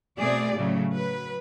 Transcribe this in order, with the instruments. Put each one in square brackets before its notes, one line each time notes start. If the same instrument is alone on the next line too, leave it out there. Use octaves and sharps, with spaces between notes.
[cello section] B2 A3 C4 G#4 D5
A2 C#3 F#3 A3
F#3 B4